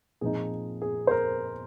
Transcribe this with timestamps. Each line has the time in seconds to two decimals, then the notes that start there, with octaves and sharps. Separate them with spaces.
0.21 A#2 F3 C4 D#4 G#4
0.82 G#4
1.07 C5
1.11 A#4